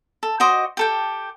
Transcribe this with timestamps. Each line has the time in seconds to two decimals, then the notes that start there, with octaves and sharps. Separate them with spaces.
0.23 A4
0.40 F#4 C5 D#5 D6
0.77 G4 A4 G5